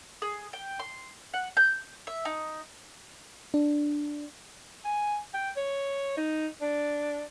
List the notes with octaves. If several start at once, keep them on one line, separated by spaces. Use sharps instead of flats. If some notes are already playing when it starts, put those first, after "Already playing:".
G#4
G5
C6
F#5
G6
E5
D#4
D4
G#5
G5
C#5
D#4
D4